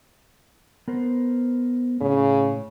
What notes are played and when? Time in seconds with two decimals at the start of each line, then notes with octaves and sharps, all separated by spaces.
0.88 B3 A#4 C5
2.01 A2 C#3